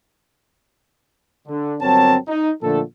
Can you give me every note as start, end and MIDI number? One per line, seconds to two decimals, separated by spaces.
1.48 1.75 50
1.81 2.16 31
1.81 2.16 54
1.81 2.16 60
1.81 2.16 70
1.81 2.16 73
1.81 2.16 81
2.28 2.51 63
2.62 2.81 46
2.62 2.81 50
2.62 2.81 53
2.62 2.81 57
2.62 2.81 69